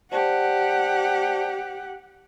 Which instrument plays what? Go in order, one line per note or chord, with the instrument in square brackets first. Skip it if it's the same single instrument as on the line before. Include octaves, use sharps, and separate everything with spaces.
[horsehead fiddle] G4 F#5 [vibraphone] C5 D5 A5